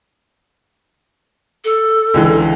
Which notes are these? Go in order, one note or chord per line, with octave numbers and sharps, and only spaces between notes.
A4
C#2 D3 E3